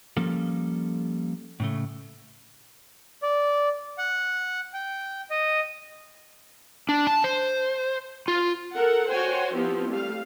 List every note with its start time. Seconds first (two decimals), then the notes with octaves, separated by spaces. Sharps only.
0.17 F3 G3 A#3 C#4 A4
1.60 A2 C#3 A3
3.23 D5
3.98 F#5
4.74 G5
5.30 D#5
6.89 D4
7.07 A5
7.24 C5
8.28 F4
8.76 A4 A#4 F#5
9.11 F#4 C5 C#5 G5 G#5
9.54 F3 B3 C4 E4 G4
9.90 G3 A3 F5